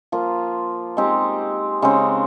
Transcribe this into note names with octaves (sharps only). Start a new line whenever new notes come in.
F3 A#3 F4
G#3 C4 D#4 G4
C#3 G#3 C4 D#4